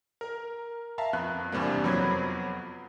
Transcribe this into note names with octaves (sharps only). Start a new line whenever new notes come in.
A#4
E5 F5 A5 A#5
F2 B3 F#6
E2 G2 C3 G3 A#3
F2 F#3 B3 C5 B5 G#6